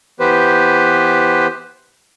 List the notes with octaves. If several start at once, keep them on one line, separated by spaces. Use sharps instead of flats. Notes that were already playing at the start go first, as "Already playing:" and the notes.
E3 B3 G4 B4 C5